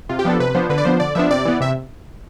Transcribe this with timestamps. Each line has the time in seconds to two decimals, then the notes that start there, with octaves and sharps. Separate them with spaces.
0.09 C3 F4
0.19 G4
0.25 F3 B3 D4 A4
0.39 C3 B4
0.55 F3 B3 D4 C5
0.69 D3 B4
0.78 D5
0.85 F3 B3 D4 C5
1.00 D3 D5
1.15 F3 B3 D4 E5
1.31 C3 D5
1.45 E3 B3
1.60 C3 E5